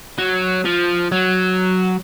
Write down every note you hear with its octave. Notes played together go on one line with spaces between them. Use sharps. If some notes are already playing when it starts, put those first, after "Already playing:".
F#3
F3
F#3